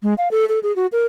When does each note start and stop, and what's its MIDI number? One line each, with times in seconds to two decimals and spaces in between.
0.03 0.14 56
0.18 0.28 77
0.31 0.45 69
0.49 0.59 69
0.63 0.74 68
0.76 0.86 66
0.92 1.06 70